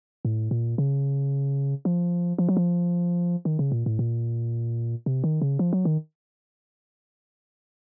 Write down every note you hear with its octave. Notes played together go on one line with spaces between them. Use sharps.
A2
A#2
C#3
F3
F3
F#3
F3
D#3
C#3
A#2
A2
A#2
C3
D#3
C#3
F3
F#3
D#3